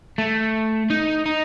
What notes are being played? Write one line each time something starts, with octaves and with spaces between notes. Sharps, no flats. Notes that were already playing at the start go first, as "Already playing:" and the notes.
A3
D#4
D#4